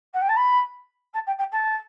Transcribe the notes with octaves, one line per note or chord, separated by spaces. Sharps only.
F#5
G5
A5
B5
A5
G5
G5
A5